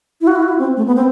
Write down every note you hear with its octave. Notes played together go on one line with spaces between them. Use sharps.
E4
F#4
E4
F#4
E4
C4
A3
B3
C4